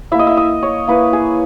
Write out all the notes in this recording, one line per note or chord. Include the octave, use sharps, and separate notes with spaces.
A#3 E4 E5
D#5
E5
D#5
C#5
A#3 E4 B4
G#4